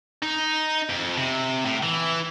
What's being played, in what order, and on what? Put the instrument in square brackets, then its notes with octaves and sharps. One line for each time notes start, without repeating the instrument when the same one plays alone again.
[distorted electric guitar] D#4
F2
C3
A2
E3